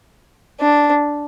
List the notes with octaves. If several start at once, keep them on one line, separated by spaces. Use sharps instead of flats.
D4